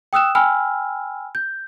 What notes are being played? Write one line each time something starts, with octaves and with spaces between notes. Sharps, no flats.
G5 D#6 E6 F#6 E7
G5 G#5 B5 E6 F6
G6